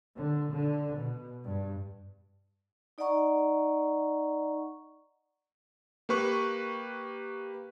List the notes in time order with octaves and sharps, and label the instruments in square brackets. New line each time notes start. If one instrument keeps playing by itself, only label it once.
[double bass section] D3
D3
B2
G2
[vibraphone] D#4 D5 D#5 F#5 A#5 C#6
[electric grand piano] A#3 G4 B4 C#6 F#6